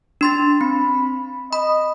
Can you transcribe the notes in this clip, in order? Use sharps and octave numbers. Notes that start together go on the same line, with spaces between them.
D4 C6 A6
C4 B5
D#5 B5